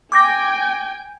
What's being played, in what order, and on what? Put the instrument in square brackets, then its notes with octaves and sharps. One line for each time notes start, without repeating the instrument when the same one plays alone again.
[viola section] G5 G#5 [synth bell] D6 G6 A#6